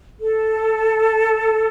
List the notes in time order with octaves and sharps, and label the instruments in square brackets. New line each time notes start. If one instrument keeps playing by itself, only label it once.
[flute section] A4